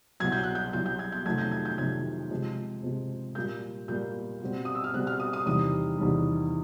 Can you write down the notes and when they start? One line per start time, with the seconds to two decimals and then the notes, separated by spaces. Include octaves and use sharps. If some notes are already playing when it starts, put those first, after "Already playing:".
0.20 C2 B2 F#3 G#6
0.32 G6
0.43 F#6
0.55 G6
0.73 C2 B2 F#3 G6
0.86 G6
0.99 G#6
1.12 G6
1.25 F2 C3 D#3 F#3 A3 G#6
1.38 G6
1.52 G#6
1.65 G6
1.78 F2 C3 D#3 F#3 A3 G#6
2.30 C3 F3 G#3 C4
2.83 C3 F3 G#3 C4
3.35 A#2 G3 A#3 G6
3.88 A#2 G3 A#3 G6
4.42 B2 G3 C4
4.65 D#6
4.75 E6
4.84 F6
4.94 B2 G3 C4 F#6
5.07 F6
5.20 D#6
5.33 D#6
5.46 E2 C3 D#3 G3 D#6
5.98 E2 C3 D#3 G3